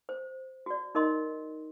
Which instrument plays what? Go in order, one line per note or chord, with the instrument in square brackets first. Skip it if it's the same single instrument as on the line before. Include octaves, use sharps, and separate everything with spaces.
[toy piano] C5
F#4 D5
D#4 A#4 D#5 C6